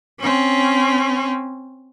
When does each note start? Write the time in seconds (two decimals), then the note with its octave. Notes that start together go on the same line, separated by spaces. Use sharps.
0.21 C4 C#4